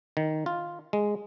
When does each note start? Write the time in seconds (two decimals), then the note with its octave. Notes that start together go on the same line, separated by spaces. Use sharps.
0.17 D#3
0.46 F4
0.93 G#3